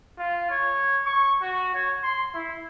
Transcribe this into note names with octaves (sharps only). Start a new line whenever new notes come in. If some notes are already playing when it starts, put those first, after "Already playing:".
F4
C#5
C#6
F#4
C#5
C6
E4